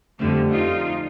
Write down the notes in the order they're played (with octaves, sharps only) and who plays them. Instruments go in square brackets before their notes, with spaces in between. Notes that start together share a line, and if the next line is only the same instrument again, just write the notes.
[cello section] F2 D3 A3 [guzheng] F3 G3
[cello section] D#4 F4